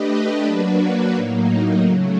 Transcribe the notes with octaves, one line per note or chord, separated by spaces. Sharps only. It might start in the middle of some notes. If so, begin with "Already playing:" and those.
Already playing: A3 D4 G4 B4 D#5
F#3 A#3 D4 F#4 B4
A2 F#3 A#3 D#4
C#3 F#3 A3